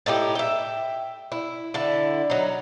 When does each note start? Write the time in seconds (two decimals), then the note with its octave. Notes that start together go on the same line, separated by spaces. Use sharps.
0.06 A2 D#4 E4 G4
0.35 E5 G5
1.32 E4
1.74 D3 E4
2.30 F#3 D#4